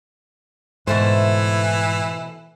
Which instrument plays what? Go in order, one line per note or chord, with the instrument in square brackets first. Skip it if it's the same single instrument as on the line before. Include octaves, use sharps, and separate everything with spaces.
[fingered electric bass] G#2 [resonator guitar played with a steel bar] B2 A3 C5 [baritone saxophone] E3